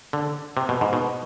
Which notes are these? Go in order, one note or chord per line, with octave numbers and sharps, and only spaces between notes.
D3
C3
B2
G#2
B2